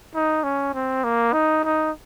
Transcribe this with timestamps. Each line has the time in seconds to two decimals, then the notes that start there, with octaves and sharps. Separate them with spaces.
0.15 D#4
0.43 C#4
0.74 C4
1.04 A#3
1.33 D#4
1.64 D#4